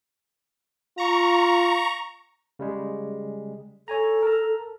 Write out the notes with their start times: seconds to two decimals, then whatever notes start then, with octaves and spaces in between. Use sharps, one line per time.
0.98 F4 A#5 C#6
2.59 C#3 G3 G#3
3.88 A4 C#5 G#5 A#5
4.23 A#4 A5 A#5